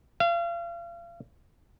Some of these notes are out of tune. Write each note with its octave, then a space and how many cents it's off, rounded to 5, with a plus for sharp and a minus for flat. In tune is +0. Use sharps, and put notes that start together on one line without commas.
F5 -35